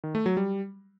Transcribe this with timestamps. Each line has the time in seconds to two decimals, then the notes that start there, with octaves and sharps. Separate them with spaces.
0.04 D#3
0.15 A3
0.26 F#3
0.37 G3